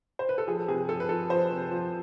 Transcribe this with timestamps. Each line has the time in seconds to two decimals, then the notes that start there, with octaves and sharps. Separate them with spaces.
0.19 C5
0.29 B4
0.38 A4
0.47 F3 G#4
0.68 C3 G#4
0.89 F3 A4
1.00 B4
1.09 F3 A4
1.30 F3 C5
1.51 C3
1.71 F3